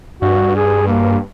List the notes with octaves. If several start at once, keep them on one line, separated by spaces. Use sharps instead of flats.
G2 F#4
G#4
A#3